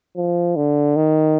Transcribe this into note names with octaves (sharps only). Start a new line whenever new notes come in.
F3
D3
D#3